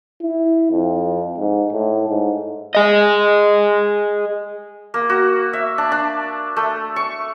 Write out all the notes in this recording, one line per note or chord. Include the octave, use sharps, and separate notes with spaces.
E4
F2
G#2
A2
G#2
G#4 D#5
A#3
F#4
E5
D4
D4
A3
C#6